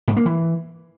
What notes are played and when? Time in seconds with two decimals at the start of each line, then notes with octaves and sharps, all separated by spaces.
0.08 G#2
0.17 A#3
0.26 E3